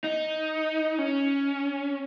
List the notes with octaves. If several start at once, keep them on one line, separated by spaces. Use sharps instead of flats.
D#4
C#4